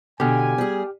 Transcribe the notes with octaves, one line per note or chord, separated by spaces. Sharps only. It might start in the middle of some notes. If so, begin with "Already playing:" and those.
B2 D3 G4 G#5 F6
G3 G#4